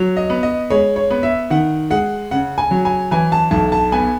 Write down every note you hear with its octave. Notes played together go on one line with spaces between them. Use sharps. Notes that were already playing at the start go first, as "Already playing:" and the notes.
Already playing: F#3
D#5
B3
D#5
G#3 C#5
C#5
B3
E5
D#3 F#5
G#3 F#5
C#3 F#5
G#5
F#3
G#5
E3 G#5
A5
B1 A5
A5
B3 G#5